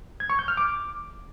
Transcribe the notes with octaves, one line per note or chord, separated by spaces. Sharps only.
G#6
C#6
G6
F6
D6